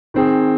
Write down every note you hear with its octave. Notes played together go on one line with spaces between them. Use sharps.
D#3 C4 G#4